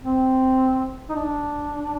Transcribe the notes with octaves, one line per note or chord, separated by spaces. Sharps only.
C4
D#4
D4